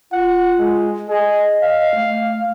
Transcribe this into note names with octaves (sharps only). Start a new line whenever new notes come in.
F4 F#5
G#3
G#4 D#5
F5
A3